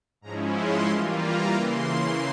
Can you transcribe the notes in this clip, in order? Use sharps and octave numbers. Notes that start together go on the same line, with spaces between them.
G#2 F3 G#3 C#4 E4 A#5
C6
E3 G3 A#3 F4
A#5
C#3 E3 A#3 C6